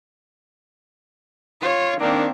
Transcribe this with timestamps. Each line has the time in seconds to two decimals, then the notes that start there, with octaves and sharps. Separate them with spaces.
1.61 F4 C#5
2.00 D#3 A#3 C4 D4